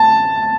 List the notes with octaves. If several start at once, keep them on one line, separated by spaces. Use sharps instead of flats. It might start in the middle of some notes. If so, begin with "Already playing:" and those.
Already playing: A5